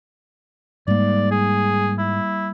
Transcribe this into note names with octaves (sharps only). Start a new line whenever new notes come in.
G#2 G3 A#3 D5
G#4
E4